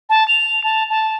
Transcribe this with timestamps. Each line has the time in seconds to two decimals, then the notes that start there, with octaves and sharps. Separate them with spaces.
0.10 A5
0.28 F7
0.64 A5
0.90 A5